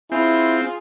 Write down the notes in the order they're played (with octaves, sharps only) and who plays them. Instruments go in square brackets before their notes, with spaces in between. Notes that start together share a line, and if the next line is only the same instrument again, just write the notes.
[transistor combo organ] C4 [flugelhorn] E4 [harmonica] F4 G#4